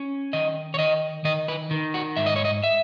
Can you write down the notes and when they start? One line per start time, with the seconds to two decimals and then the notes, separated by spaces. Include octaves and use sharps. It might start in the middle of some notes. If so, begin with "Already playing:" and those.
Already playing: C#4
0.33 D#3 D#5
0.74 C#5
0.79 D#3 D#5
1.25 D#3 D#5
1.48 B4
1.71 D#3
1.94 F#4
2.17 G#2 E5
2.26 D#5
2.36 C#5
2.45 D#5
2.63 E5